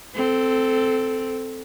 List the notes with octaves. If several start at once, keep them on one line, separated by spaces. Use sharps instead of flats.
C4 A4